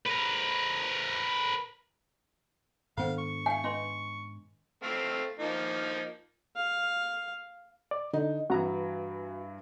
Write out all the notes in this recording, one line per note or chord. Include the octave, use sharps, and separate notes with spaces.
A#4 B4
G#2 D#3 B3 D4 C5 F5 F#5
C#6
E5 F5 G#5
C#4 B4 D#5 C6
A3 C4 F5
F3 A#3 D#4
F5
D5
D3 D#4
G2 E3 F#4 A#5